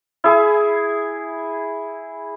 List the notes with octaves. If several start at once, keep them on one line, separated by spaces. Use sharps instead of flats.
E4 G#4